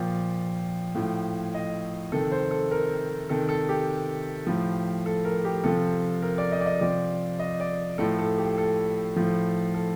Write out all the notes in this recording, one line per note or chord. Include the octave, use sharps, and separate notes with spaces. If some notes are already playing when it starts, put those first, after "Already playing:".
Already playing: A#2 F3 G5
A2 F3
D#5
C3 D#3 A4
C5
A4
A#4
C3 D#3 A4
A4
G4
A2 F3
A4
A#4
G4
C3 F3 A4
A#4
D5
D#5
D5
D#5
C3 F3 D5
D#5
D5
A2 F3 A4
A4
G4
A4
A2 F3
A4